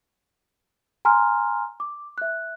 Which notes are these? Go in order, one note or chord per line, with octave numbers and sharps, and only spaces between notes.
G#5 A#5 C6 F6
D6
E5 F#6